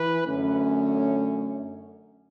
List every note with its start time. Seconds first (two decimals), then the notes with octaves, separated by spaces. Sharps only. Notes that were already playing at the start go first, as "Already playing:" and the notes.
Already playing: E3 B4
0.26 F#2 D3 A3 C#4